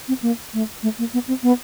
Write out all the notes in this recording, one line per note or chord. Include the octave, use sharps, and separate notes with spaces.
C4
A#3
A3
A3
A#3
B3
C4
B3